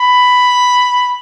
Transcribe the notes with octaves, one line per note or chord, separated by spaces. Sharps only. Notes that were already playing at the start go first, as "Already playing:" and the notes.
Already playing: B5